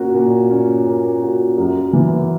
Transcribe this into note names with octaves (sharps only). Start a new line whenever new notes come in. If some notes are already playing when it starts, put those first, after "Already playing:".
Already playing: A#2 A#3 C#4 F#4
A#2
C#4
A#3
F#4
F#2
E3